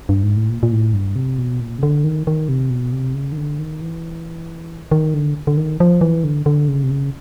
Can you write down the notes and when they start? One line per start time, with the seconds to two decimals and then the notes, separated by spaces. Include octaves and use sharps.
0.09 G2
0.23 G#2
0.37 A2
0.50 A#2
0.63 A#2
0.72 A2
0.94 G2
1.16 C3
1.38 B2
1.60 A#2
1.78 C#3
1.83 D3
2.04 D#3
2.27 D#3
2.49 C3
2.70 B2
2.92 C3
3.14 C#3
3.32 D#3
3.37 D3
3.59 D#3
3.81 E3
4.92 D#3
5.14 D3
5.47 D3
5.57 D#3
5.80 F3
6.01 E3
6.24 D3
6.46 D3
6.68 C#3
6.83 C3
6.91 C#3